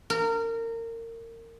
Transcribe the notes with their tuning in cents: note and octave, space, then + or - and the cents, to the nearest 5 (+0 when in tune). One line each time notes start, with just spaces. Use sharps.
A#4 -25